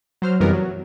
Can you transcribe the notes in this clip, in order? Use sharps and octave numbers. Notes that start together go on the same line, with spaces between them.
F#3 C5 F6
F#2 C3 E3 G3 B3 A#4
F#3